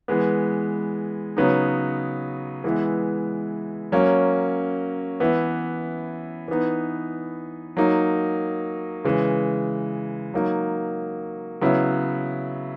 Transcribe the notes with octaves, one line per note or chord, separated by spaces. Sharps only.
E3 G#3 B3
C#3 F#3 B3 D#4
E3 G#3 B3 E4
F#3 A#3 C#4
E3 B3 E4
E3 B3 D#4
F#3 A#3 D#4
C#3 E3 G#3
F#3 A#3 D#4
C#3 F#3 B3 E4